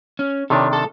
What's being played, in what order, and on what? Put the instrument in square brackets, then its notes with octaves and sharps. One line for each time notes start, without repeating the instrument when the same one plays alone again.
[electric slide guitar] C#4
[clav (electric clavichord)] C3 D#3 D4 [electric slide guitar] A4 C#5
[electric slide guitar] A4